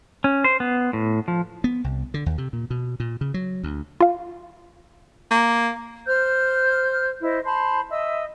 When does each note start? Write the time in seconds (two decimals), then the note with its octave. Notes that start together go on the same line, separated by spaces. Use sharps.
0.24 C#4
0.44 C5
0.60 B3
0.93 A2
1.28 F3
1.64 B3
1.84 C2
2.14 D3
2.26 D#2
2.38 C3
2.53 A#2
2.70 B2
3.00 A#2
3.21 C#3
3.34 F#3
3.64 D2
4.01 F4 F5
5.31 A#3
6.06 C5 F6 G6
7.21 E4 C5 D#5
7.45 C5 A5 B5 C6
7.90 D#5 E5 E6